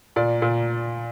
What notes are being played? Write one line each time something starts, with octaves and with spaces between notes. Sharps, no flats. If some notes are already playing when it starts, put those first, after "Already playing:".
A#2 D5
A#2